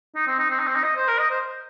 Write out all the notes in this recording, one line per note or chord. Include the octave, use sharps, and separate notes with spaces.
D#4
C4
D#4
C4
D#4
C4
D#4
D#5
C5
A#4
D#5
C5